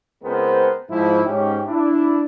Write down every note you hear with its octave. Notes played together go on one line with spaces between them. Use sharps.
C#2 G#3 B3 C4 A#4 C5
G#2 F3 E4
G#2 C#4 G4
D4 E4